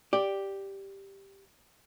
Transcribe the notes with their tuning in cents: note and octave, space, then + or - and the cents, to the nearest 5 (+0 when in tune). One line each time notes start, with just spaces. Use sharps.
G4 +0 D5 +0